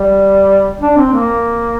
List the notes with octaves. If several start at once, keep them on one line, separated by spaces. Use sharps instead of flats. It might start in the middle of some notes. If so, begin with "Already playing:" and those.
Already playing: G3
D4
C4
A#3